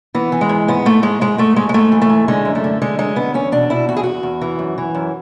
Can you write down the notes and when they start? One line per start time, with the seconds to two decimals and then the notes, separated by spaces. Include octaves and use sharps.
0.14 E3 B3
0.32 E3
0.41 G#3
0.49 G#2
0.68 G#2 B3
0.86 G#2 A3
1.03 G#2 G#3
1.21 G#2 G#3
1.38 G#2 A3
1.56 G#2 G#3
1.69 G#3
1.74 G#2 A3
1.92 E3
2.02 A3
2.10 G#2
2.28 D3 G#3
2.45 F#2
2.55 A3
2.64 D3
2.82 D3 G#3
2.98 F#2 G#3
3.16 D3 B3
3.34 E2 C#4
3.52 B2 D4
3.70 B2 E4
3.89 E2 F#4
3.97 G#4
4.04 E2 F#4
4.23 E2
4.41 E3
4.59 F#2
4.78 E3
4.94 F#2